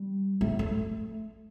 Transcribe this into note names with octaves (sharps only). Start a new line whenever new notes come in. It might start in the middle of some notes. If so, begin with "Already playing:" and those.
Already playing: G3
A3
A3